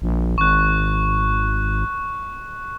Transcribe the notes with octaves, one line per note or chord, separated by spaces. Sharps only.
A#1
G#1 C#6 F#6